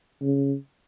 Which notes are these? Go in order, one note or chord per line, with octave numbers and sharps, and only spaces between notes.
C#3